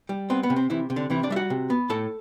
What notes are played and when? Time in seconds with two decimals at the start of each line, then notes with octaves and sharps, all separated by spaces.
0.09 G3
0.30 B3 C4
0.43 B3
0.50 C3
0.56 C4
0.70 C3 E3 E4
0.90 C3
0.96 D3 D4
1.10 C3 E3 E4
1.23 D4 D5
1.30 G3 E5
1.36 F#4 F#5
1.50 C3
1.70 B3
1.90 A2 A4 A5